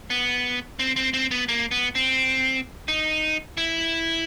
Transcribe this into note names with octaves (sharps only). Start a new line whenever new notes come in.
B3
C4
C4
C4
B3
A#3
B3
C4
D#4
E4